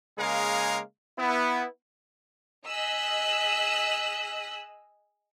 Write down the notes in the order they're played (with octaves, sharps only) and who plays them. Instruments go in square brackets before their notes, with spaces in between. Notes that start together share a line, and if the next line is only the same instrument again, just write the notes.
[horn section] C#3 G#3 A#3 G#4 A#4 F5
B3 E4
[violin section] G#4 D#5 E6 F#6 B6